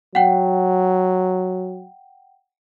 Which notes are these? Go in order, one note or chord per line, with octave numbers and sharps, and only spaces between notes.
F#3 F#5 G5